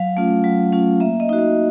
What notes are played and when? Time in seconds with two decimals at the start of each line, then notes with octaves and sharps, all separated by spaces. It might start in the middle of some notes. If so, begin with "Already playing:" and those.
Already playing: F#3 F5
0.17 A3 C#4 F4
0.44 F#3
0.73 A3 C#4 F4
1.00 A#3 E5
1.20 D#5
1.29 D#4 F#4
1.38 D#5